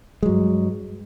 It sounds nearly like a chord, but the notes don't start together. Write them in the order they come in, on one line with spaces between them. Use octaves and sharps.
G#3 F#3 G2